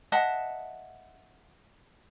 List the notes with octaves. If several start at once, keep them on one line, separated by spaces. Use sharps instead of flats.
D#5 E5 F#5 A5